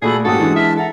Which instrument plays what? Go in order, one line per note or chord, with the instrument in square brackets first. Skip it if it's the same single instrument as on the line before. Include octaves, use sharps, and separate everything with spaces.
[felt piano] A#2 A3 F#4 [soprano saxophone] G#4 [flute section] A4 B5
[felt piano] G#2 A#3 G4 [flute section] C#4 F#4 D#6 [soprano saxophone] A4
[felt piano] E3 G#3 D4
[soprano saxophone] E5 [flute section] A5 F6
[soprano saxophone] A4 [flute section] E5 F#5 A#5